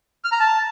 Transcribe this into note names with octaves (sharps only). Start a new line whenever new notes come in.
F6
A#5
A5